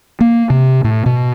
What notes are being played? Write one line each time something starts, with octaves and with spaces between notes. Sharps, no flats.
A#3
C3
A2
B2